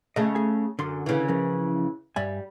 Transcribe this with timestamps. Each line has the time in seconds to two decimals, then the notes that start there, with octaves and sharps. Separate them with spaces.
0.16 C#3 A3 D#5
0.35 G#4 G#5
0.79 F#2 D3 C6
1.06 C#3 E3
1.28 F3 C#4 A#4
2.16 G2 G3 E5 G#5